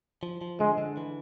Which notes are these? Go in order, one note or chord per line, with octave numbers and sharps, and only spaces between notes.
F3
F3
D3 G#3
D3
E3